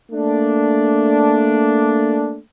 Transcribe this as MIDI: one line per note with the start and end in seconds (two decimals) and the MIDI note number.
0.12 2.39 57
0.12 2.39 58
0.12 2.39 62